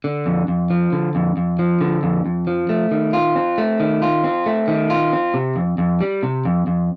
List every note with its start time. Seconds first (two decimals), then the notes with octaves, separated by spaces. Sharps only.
0.04 D3
0.26 F2
0.48 F2
0.70 F3
0.92 D3
1.15 F2
1.37 F2
1.59 F3
1.81 D3
2.03 F2
2.26 F2
2.47 F3
2.69 A3
2.91 D#3
3.13 F4
3.36 C4
3.58 A3
3.80 D#3
4.02 F4
4.24 C4
4.46 A3
4.68 D#3
4.90 F4
5.13 C4
5.34 C3
5.56 F2
5.78 F2
6.01 G3
6.23 C3
6.45 F2
6.67 F2